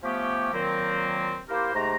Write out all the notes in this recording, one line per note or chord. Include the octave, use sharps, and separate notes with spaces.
F3 A3 B3 C#4 G4
A#2 D#3 F#3 A#3 C4
A#3 E4 G4 A#4 C5
G#2 C3 A3 C5 A#5